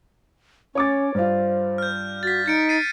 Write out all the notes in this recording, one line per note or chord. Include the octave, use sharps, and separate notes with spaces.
C#4 C#5 D6 A6
G2 F4 C5
F6 G6
F#4 A6 B6
D#4 G6 C#7 D7
A6 C7 D#7